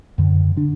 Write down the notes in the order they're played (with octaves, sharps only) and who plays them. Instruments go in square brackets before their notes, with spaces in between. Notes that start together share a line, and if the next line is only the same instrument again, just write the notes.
[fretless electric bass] F#2 D3
D3 D4